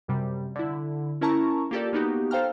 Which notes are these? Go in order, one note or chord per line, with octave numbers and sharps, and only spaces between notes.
F#2 C3 G3
D3 E4
C#4 E4 A#4 A5 A#5 C#6
A#3 F4 G4 A4 A#4 D5
A#3 B3 D#4 F#4 G4
A4 C5 F5 G5 A#5 F6